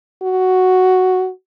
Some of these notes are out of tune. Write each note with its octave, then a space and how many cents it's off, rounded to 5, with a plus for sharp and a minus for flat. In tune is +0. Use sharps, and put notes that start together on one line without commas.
F#4 +5